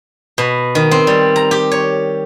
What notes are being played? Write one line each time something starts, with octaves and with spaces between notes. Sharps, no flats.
B2
D#3
C4
G3
A#5
G4
C#5